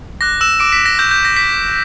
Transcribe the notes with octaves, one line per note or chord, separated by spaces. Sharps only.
D6 F#6 A#6
E6 E7
D6 D7
B6
A#6
C#6 E6 G6
G6
A#6
B6